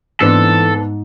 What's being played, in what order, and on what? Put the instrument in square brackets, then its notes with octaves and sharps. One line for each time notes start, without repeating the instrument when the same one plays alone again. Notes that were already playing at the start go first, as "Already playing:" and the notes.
[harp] G#2 [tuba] E3 [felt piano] B3 C4 D4 [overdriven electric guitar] A4